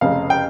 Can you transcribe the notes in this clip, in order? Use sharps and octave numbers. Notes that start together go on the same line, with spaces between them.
F1 F2 C#3 F5
G5